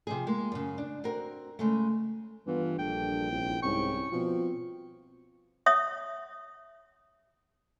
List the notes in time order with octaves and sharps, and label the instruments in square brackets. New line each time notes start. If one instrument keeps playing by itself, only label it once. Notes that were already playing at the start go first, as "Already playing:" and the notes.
[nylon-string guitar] C3 F3 G#4
G#3 A#3
F#2 C#3
D4
C4 F#4 A#4
C#3 G#3 A3
[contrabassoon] G2 [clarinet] E3 [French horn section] A3 F4 [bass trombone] B3
[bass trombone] A#1 [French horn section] A#2 A4 [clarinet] G5
[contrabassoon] C2 [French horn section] C#4 E4
[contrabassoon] C2 [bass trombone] G#2 [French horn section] C#4 E4 [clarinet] C#6
[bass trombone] B2 [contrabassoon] F3 [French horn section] C4
[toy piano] C#5 E5 D#6